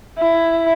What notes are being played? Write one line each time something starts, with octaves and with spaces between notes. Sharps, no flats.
E4